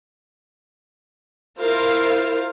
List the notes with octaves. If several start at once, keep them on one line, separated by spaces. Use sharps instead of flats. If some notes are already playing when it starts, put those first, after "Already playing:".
E4 F4 A#4 C5 F5